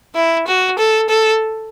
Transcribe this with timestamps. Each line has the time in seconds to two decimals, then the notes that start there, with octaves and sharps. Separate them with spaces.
0.15 E4
0.47 F#4
0.78 A4
1.09 A4